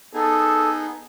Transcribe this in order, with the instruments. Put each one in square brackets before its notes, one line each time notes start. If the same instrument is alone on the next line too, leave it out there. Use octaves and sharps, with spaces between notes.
[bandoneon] B3 D#4 G#4 [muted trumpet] A4